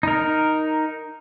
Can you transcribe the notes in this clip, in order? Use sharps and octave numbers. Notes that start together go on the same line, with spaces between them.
D#4 A#4